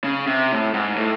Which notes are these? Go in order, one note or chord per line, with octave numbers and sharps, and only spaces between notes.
C#3
C3
A2
G#2
A2